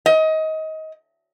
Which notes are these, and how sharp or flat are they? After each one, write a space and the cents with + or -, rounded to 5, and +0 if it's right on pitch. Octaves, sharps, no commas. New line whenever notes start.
D#5 +25